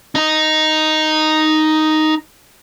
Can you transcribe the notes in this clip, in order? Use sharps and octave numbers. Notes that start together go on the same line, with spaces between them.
D#4 D#5